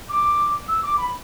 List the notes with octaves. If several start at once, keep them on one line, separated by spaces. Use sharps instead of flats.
D6
E6
D6
B5